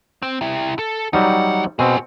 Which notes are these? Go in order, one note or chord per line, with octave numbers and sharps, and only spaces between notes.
C4
C3 E4
A4
D#2 F#3 G3 D#4 F#5
B2 C4 F#4 G#4